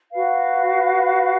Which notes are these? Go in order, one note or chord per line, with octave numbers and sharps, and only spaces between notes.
F#4 B4 F5